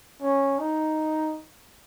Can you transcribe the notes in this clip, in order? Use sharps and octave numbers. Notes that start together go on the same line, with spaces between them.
C#4
D#4